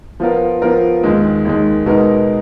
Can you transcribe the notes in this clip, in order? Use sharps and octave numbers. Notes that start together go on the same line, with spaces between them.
F3 B3 F4 A#4
F3 B3 F4 A#4
D#2 D#3 G#3
D#2 D#3 G#3
B2 G#3 B3 D#4 A#4